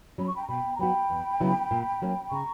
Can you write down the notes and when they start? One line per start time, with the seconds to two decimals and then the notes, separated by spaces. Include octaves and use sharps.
0.18 F#3 C#4 B5
0.26 C#6
0.34 G5 B5
0.42 A#5
0.48 B2 G5 B5
0.75 A#5
0.79 F#3 B3 F#4 G5 B5
1.10 E2
1.40 C#3 F#3 B3 E4
1.71 A#2
2.02 F#3 A#3 C#4
2.32 C#3 A#5 C#6